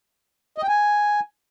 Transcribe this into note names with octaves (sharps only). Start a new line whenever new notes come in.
D#5
G5
G#5